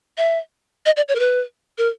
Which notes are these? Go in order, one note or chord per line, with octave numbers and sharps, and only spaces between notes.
E5
D#5
D5
C#5
A#4
B4
A#4